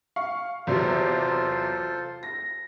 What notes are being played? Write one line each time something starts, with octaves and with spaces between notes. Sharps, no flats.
F5 C#6
E2 C3 F#3 F4 A4 C5
A#6